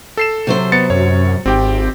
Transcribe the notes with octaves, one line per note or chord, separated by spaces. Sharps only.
A4 C7 E7
C3 F#3 C5
B3 A6 C#7
F#2 C#5
G#1 C4 G4 G5